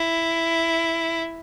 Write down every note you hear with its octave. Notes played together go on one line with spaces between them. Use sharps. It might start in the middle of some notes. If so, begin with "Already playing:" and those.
Already playing: E4